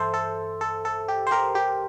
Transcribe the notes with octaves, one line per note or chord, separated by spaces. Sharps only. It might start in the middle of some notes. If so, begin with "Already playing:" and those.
Already playing: G2 E3 A4 C5 E5
A4
A4
A4
G4
C5
G4 A#4
G4